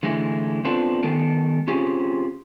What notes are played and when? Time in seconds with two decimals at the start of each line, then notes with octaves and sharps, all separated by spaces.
0.03 D3 E3 G#3 A3 E4
0.64 B3 C4 D4 F4 A4 B4
1.03 D#3 G#3 B3 A4 A#4
1.68 C4 C#4 F4 G4 G#4